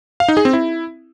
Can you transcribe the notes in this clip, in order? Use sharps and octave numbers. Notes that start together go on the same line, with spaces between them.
F5
D#4
G#4
C4
E4